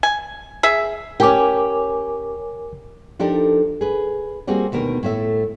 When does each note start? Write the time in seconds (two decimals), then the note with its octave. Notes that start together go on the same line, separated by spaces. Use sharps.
0.03 G#5
0.63 G#4 E5
1.20 C#4 G4 A#4 G#5 D6
3.19 F3 D4 D#4 G4 A4 A#4
3.81 G#4 B4
4.47 G3 A#3 C4 F#4 G#4
4.72 D2 B2 D#3 A#4
5.03 A2 A3 E5